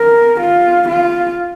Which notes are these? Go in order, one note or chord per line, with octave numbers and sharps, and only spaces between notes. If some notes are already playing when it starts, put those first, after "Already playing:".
Already playing: A#4
F4
F4